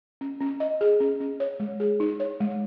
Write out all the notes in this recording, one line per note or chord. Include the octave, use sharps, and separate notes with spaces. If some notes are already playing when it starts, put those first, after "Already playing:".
C#4
C#4
D#5
G#4
C#4
C#4
C#5
G#3
G#4
D#4
C#5
G#3